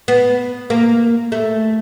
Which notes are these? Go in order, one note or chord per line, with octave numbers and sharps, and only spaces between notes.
B3
A#3
A3